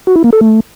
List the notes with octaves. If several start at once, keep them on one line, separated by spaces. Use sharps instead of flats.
F#4
E4
A#3
A4
A3